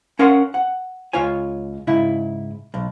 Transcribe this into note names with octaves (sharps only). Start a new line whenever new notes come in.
C#4 A#4 F5 F#5 C6
F#5
C#2 F4 C#5 G#5
G#2 C#3 E4
B1